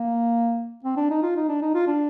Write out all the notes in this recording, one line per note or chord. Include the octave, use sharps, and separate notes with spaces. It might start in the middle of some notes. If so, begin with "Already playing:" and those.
Already playing: A#3
C4
D4
D#4
F4
D#4
D4
D#4
F4
D4